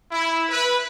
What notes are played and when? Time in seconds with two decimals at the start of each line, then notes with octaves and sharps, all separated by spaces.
0.10 E4
0.49 B4